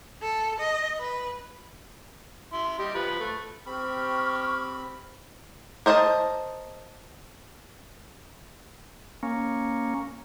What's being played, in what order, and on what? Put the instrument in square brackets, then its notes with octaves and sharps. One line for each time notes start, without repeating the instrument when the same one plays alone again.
[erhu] A4
D#5
B4
[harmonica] E4 C6
G3 G4 D#5
F3 B4
A3
[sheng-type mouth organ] C4 [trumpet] G4 [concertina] B5 [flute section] C#6 F6
[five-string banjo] A#4 C5 D#5 E5 A5
[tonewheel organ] A#3 C#4